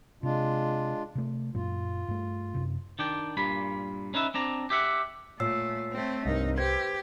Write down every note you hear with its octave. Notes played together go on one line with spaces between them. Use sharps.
C3 G#3 D4 F4
C3 A3
F#2 A#2 F4
G2 A3
F#2 C3
D#3 D4 G5
G2 A#2 B5
C#4 D#4 B4 E5
C4 D4 A#5
G4 E5 F#5
A#2 A3 C#5 E6 C7
A3 C4
C2 G2 C4 D#4 A#4
G4 B4 C5 G#6